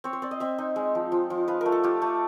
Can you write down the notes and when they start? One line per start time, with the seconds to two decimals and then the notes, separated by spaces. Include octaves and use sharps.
0.04 C4 C#5
0.13 C5
0.22 C4 D5
0.31 D#5
0.40 C4 E5
0.58 D#4
0.76 G#3
0.95 F3
1.12 F3
1.30 F3
1.48 F4 B4
1.61 A3 A#4
1.72 A4
1.84 F4 G4
2.02 A3